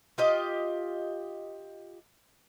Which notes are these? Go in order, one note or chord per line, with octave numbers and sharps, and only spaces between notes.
F4 G4 D#5